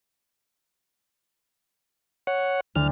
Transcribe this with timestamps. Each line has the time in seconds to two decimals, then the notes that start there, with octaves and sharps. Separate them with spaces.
2.27 C#5 F#5
2.75 D2 F6